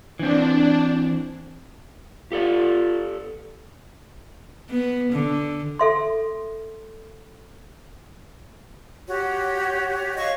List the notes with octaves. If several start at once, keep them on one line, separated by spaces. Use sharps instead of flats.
E3 C4 D4
F4 G4 A4 D5
B3
D3
A4 E5 C6
F#4 G4 C#5
C#5 D#5 F5 C#6